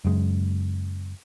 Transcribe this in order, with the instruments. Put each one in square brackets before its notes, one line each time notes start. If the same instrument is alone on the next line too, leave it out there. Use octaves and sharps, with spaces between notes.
[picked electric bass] F#1 F#2 G#3